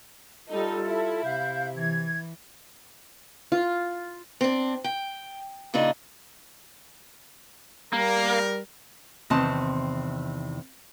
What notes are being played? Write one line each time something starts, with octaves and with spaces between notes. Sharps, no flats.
G3 D#4 F4 A4
E4
C3 F5 G6
E3 G#6
F4
C4 D4
G5
A#2 C#3 D4 D#4
G3 A#3 A#4
E2 C3 D#3 C4 D#5 A5